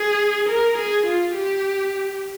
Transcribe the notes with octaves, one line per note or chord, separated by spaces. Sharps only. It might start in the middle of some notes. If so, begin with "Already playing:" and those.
Already playing: G#4
A#4
G#4
F4
G4